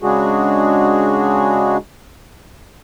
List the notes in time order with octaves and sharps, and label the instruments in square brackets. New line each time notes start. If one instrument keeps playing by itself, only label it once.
[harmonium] C#3 G#3 D4 F#4 G#4